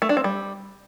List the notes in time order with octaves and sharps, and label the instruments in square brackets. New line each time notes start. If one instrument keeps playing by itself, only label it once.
[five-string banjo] A3
D4
C4
G3